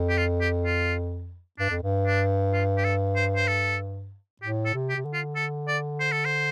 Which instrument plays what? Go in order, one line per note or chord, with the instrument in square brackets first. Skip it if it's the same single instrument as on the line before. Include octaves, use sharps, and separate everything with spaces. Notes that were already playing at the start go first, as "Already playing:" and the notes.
Already playing: [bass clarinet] F2
[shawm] G4
F4
G4
F4
[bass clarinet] G2 [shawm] D4
[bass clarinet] F2
G2
[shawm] D4
F4
G4
A4
C5
C5
A4
[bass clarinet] A2 [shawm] G4
[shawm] A4
[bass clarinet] C3
[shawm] G4
[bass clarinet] C3
D3
[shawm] F4
A4
D5
C5
A4
C5